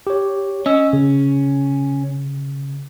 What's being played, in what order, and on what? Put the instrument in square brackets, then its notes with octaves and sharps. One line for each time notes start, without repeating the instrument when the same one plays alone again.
[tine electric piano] G4 C#5
[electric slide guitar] C#4 [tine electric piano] D#5 E6
[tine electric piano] C#3